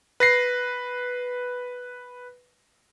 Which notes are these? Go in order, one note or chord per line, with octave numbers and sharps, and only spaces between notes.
B4 A#6 C7